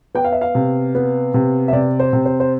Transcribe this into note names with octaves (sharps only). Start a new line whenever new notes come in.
B3 G5
F5
E5
F5
C3
B3
C3
E5
C3 D5
C5
C3
C5
C5